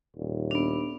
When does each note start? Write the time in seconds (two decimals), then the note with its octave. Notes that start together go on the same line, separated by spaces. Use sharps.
0.16 D#1
0.51 B3 D4